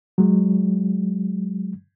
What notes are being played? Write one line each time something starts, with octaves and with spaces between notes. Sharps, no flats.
F#3 G#3